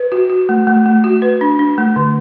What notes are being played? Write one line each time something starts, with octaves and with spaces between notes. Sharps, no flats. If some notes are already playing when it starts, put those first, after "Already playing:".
Already playing: B4
F#4
F#4
A3
A3
A3
F#4
B4
D4
D4
A3
D3